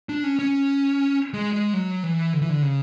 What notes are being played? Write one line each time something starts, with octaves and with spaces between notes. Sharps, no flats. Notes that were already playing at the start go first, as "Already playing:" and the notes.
D4
C#4
C#4
G#3
G#3
F#3
E3
D3
E3
D3
C#3